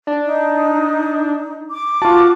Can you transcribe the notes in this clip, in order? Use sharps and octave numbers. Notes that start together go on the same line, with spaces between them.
D4
D#4
D6
F4 F#4 A5